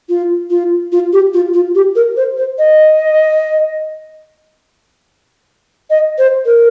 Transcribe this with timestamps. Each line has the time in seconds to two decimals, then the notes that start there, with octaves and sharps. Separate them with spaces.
0.09 F4
0.50 F4
0.92 F4
1.13 G4
1.34 F4
1.54 F4
1.75 G4
1.96 A#4
2.17 C5
2.37 C5
2.58 D#5
5.90 D#5
6.18 C5
6.46 A#4